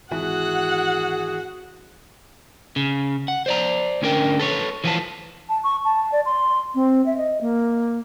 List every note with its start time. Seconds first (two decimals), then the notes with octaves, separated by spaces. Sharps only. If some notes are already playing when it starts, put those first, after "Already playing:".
0.11 G#1 E3 F#4 G#4 F#5
2.76 C#3
3.28 F#5
3.46 C5 D5 A#5
4.02 D2 C#4 D4 A#4 G5
4.39 A4 B4 C#5
4.84 E3 F3 B3 F4 B4 A5
5.49 A5
5.64 C#6
5.85 A5
6.12 D5
6.26 C6
6.75 C4
7.06 E5
7.18 D#5
7.41 A#3